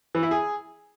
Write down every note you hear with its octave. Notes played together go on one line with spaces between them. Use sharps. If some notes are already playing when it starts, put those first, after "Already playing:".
E3
E4
G#4